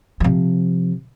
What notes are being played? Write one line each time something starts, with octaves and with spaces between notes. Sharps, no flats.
C3 F3